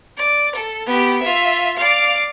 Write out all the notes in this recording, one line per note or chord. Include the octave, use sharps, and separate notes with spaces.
D5
A4
B3 G4
F4 E5
D5 F5